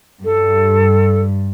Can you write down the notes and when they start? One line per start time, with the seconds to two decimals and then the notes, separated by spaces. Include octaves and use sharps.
0.24 G2 A4